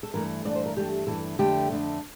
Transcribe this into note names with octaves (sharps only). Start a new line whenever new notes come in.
A4
G2 E3 A3 A#4
G2 E3 A3 D5
C5
A#4
G2 E3 A3 G4
G2 E3 A3 A4
F2 D3 A3 G4
F2 D3 A3